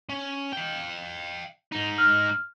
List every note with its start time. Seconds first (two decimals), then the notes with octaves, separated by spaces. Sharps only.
0.09 C#4
0.52 F5 G5
1.72 G#2 D#4
1.98 F6